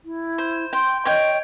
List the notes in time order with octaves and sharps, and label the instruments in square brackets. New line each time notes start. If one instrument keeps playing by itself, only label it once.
[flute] E4
[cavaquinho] C5
[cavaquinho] G5 [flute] C6
[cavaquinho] C#5 G5 [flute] D#5